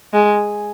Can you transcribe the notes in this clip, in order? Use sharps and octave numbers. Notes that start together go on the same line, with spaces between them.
G#3